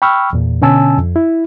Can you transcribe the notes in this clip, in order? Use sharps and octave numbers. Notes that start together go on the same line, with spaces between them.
G5 B5 C#6 E6 F6
E2 A#2
B2 D3 C#4 G#5 A5 E6
F2
E4